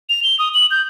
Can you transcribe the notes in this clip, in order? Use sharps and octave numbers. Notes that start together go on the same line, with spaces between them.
F7
G7
D#6
F#7
G6